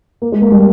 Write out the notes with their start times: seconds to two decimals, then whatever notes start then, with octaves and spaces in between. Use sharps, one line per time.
0.22 A#3
0.32 G#3
0.42 A#3
0.52 G3